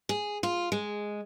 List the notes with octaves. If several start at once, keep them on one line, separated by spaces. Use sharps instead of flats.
G#4
F4
G#3